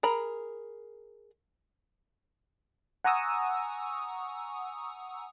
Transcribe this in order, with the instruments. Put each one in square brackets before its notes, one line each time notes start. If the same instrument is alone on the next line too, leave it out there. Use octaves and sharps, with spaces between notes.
[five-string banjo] G#4 A#4 A#5 B5
[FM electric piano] F#5 G#5 A#5 C#6 D#6 E6